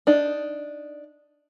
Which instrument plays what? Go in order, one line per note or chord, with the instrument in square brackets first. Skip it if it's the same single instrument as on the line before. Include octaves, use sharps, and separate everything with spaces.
[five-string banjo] D4 D#4